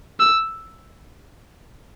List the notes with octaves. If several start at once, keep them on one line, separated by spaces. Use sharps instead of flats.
E6